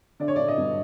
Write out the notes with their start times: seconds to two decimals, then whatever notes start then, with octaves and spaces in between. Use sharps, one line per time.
0.20 D3 D5
0.28 C#5
0.36 D3 D5
0.48 D#5
0.58 G2